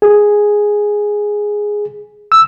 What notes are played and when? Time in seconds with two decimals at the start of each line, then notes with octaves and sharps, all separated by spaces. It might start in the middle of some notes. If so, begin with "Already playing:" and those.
0.02 G#4
2.32 E6